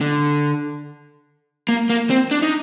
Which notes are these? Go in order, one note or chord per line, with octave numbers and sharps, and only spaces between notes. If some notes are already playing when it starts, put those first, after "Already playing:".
D3
A#3
A#3
C4
D4
D#4